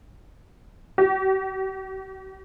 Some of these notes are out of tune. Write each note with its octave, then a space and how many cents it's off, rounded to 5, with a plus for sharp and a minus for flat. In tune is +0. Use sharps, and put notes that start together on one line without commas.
G4 -45